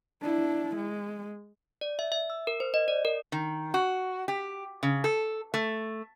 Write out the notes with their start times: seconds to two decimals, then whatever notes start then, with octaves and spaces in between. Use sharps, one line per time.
0.22 D4 E4
0.76 G#3
1.81 D5
1.99 E5
2.12 E5
2.30 E6
2.47 A#4
2.60 C5
2.74 D#5
2.88 D5
3.05 A#4
3.32 D#3
3.74 F#4
4.28 G4
4.83 C#3
5.04 A4
5.54 A3